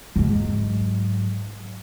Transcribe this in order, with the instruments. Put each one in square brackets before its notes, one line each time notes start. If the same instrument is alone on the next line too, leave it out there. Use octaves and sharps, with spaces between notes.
[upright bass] G#2 F#3